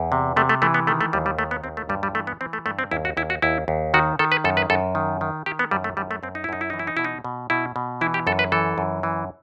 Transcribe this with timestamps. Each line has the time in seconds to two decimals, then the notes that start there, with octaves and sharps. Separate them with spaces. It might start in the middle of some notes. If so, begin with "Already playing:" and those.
Already playing: E2
0.12 C3
0.36 C3 A3
0.49 A3
0.62 E3 A3
0.74 B3
0.87 D#3 A3
1.01 A3
1.13 D#2 G3
1.26 G3
1.39 D#3 A3
1.51 B3
1.64 D#2 C4
1.77 A3
1.89 G2 G3
2.03 G3
2.15 E3 A3
2.27 B3
2.41 E3 C4
2.53 A3
2.66 G2 A3
2.79 C4
2.91 D#2 E4
3.05 F#4
3.17 D#2 E4
3.30 F#4
3.42 D#2 E4
3.68 D#2
3.94 D#3 F#4
4.19 D#3 A4
4.32 B4
4.44 F#2 A4
4.57 B4
4.70 F#2 A4
4.95 D#3
5.21 D#3
5.46 D#3 G4
5.59 B3
5.71 F#2 G3
5.84 A3
5.97 F#2 G3
6.11 A3
6.23 F#2 C4
6.35 D#4
6.44 E4
6.49 F#2 D#4
6.61 E4
6.70 E3 D#4
6.79 E4
6.87 D#4
6.97 B2 E4
7.05 D#4
7.24 B2
7.50 B2 E4
7.76 B2
8.01 E3 E4
8.14 G4
8.27 F#2 A4
8.39 B4
8.52 E3 A4
8.78 F#2
9.03 E3